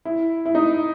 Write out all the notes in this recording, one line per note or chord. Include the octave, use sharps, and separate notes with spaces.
E4
E4
D#4